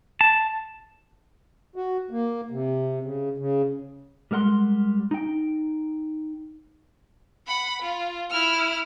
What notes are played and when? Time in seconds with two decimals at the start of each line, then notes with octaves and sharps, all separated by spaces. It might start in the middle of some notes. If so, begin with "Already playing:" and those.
0.21 A5
1.76 F#4
2.11 A#3
2.51 C3
3.02 C#3
3.37 C#3
4.31 G3 G#3 A#4 F#5 C6
5.11 D#4 G5
7.47 F#5 B5
7.82 F4
8.30 E4 F6